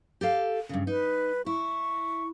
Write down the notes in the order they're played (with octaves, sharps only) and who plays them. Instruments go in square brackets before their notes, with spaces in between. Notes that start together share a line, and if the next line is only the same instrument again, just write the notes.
[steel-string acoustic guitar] G4 A4 F5
G2 C#3
[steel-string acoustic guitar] D#4 [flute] B4
[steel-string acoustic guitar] E4 [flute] C#6